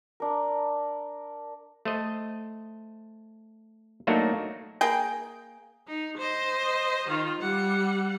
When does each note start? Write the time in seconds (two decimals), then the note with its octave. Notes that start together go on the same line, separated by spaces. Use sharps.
0.20 D4 A#4
1.85 A3 C5 D#5
4.07 F#3 A3 A#3 D4 D#4 F#4
4.81 A#3 G#4 G5
5.87 D#4
6.17 C5 D#5
7.08 D#3 F4
7.41 G3 F#5